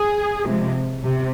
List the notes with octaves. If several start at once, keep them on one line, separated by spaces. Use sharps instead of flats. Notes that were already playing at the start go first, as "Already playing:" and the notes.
Already playing: G#4
C3 F3 G#3
C3